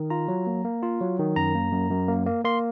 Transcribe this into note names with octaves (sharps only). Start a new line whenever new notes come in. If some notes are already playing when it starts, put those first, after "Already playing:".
Already playing: D#3
F4 A#5
F#3
A#3
A#3
F4
F#3
D#3
F#2 A#5
A#3
F#2
F#2
A#3
A#3
A#3 C6